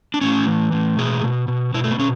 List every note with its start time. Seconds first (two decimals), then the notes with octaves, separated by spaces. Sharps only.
0.14 D4
0.21 A2 C#4
0.47 E3
0.72 A2
0.99 B2 G#4
1.24 B2
1.48 B2
1.74 B2 E4
1.84 A3
1.92 B3
1.99 B2 C#4